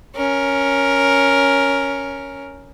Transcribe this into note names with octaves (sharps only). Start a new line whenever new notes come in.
C#4 A#4